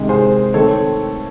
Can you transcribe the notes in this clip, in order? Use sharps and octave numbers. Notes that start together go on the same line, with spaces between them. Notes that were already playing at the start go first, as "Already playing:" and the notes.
Already playing: C3 D#3 G#3
G#4 C5
D#3 A3 C4 A4 C#5